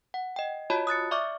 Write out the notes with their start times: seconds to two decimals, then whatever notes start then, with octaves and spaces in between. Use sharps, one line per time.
0.14 F#5
0.36 D#5 G5
0.70 F4 F#4 C#5 D#5 A5 B5
0.87 D#6 F#6 A6 C#7
1.11 D5 E5 C#6 D6 F6